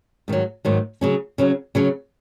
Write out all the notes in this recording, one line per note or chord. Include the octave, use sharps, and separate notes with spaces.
G#2 D#3 F#3
G#2 D#3 F#3
C#3 F#3 C#4
C#3 F#3 C#4
C#3 F#3 C#4